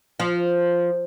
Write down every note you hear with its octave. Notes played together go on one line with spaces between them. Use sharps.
F3